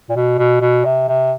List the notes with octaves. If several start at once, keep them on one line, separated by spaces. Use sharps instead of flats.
A#2
B2
B2
B2
C3
C3